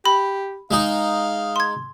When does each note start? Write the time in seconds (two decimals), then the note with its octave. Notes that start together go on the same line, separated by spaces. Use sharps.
0.05 G4 B5
0.71 G#3 D#4 F5
1.56 C6 G#6